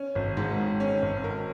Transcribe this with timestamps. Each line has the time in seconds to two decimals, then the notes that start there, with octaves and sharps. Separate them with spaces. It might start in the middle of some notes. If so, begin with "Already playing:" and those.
Already playing: C#4
0.15 G#1
0.37 G#2
0.58 D#3
0.80 C#4
1.02 G#1
1.24 A#4